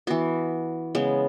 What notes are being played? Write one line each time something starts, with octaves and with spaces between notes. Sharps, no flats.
E3 B3 F#4
C#3 G#3 B3